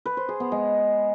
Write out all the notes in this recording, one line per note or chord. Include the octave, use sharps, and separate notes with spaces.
B4
C5
G#4
B3
G#3